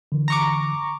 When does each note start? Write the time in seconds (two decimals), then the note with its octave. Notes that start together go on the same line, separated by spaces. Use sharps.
0.12 D3 E3
0.28 A#5 C#6 D6